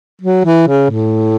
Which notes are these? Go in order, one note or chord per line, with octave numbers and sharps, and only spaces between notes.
F#3
E3
C#3
A2